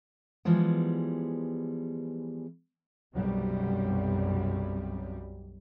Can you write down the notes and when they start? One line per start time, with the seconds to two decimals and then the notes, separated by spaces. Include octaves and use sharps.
0.45 E3 F3 G3 G#3 B3
3.14 B1 F#2 C3 G3